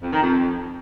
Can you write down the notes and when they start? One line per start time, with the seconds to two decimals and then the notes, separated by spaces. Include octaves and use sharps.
0.03 F2
0.13 D#3
0.23 F2